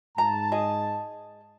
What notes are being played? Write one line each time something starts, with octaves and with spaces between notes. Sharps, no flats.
G#2 A5 A#5
G#4 D#5